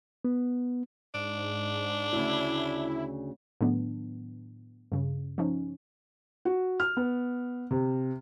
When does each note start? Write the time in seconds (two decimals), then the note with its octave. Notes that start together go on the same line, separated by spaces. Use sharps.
0.25 B3
1.14 G#2 D4
2.13 D2 C#3 E4
3.61 A2 D#3 F#3 B3 D4
4.92 G2 C#3
5.38 F3 C#4 D#4
6.45 F#4
6.80 F6
6.97 B3
7.71 C3